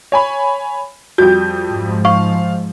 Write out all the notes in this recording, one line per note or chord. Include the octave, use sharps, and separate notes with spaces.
C#5 G#5 B5
F2 G3 F#4 G6
G#2 F3
F5 C#6